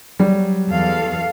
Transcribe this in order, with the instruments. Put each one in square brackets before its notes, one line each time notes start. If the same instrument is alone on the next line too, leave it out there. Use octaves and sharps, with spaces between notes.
[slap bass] F#3 [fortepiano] G3
[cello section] E2 A4 F5